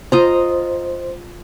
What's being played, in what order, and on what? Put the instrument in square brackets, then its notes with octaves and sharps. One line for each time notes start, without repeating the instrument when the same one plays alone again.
[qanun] F4 D#5 A#5 [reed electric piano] C5